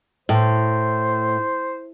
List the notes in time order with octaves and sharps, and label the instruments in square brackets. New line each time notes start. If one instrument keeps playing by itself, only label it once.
[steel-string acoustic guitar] A2 [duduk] C5